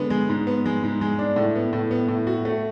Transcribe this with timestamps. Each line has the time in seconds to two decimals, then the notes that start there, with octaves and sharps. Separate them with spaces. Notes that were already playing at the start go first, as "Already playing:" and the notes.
Already playing: D3 G#3 B3
0.10 G#3
0.29 G#2
0.47 B3
0.66 G#3
0.84 G#2
1.01 G#3
1.19 D4
1.36 A2
1.55 B3
1.73 A2
1.91 B3
2.08 A2
2.27 F#4
2.45 A3